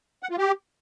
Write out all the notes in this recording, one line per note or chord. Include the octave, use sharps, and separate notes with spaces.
F#5
F4
G4